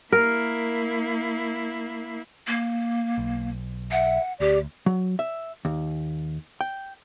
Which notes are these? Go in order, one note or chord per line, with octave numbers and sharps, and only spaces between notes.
A#3 E4 A#4
A#3
B1
E5 F#5
D2 G4 D5
F#3
E5
D#2
G5